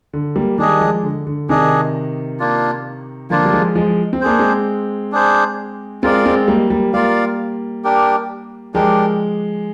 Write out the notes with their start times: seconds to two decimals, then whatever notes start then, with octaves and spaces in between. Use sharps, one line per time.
0.13 D3
0.36 G3 A#3
0.58 D#3 G3 D4 G#4 D#5
0.81 F3 G#3
1.03 D3
1.27 D3
1.49 C3 D#3 D4 G#4 D#5
2.39 A#3 D4 F4
3.30 D3 F3 A#3 D4 F4
3.45 G3
3.53 F3 G#3
3.75 F3 G#3
4.13 C4
4.21 A#3 D4 G#4 C5
4.39 G#3 C4
5.12 D4 G#4 C5
6.03 G#3 C4 F4 A#4 D5 F5
6.26 G#3 C4
6.48 G3 A#3
6.70 G3 A#3
6.93 G3 A#3 F4 A#4 D5 F5
7.84 D4 G4 A#4
8.74 F3 G#3 D4 G4 A#4